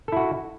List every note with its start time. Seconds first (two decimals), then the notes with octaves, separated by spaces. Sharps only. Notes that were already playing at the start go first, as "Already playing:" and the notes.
0.08 A4
0.12 E4
0.17 F#4